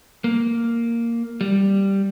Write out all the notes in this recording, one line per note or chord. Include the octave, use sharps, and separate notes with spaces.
A#3
G3